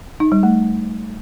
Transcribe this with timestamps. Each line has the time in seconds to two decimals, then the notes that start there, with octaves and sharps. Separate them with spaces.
0.20 D#4
0.32 G3
0.43 A3